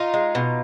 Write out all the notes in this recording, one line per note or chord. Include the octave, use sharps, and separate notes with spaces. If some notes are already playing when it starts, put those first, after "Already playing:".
Already playing: D#4 F4
G#3
B2